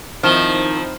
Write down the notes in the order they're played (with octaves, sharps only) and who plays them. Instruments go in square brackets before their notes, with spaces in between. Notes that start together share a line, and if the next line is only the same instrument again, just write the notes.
[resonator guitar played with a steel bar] D#3 [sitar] F3 [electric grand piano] C4 D#4 E4 [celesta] F6 E7 G7